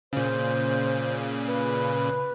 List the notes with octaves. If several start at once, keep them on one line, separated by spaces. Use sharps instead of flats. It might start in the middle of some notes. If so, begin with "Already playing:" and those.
A#2 C#3 C5
B4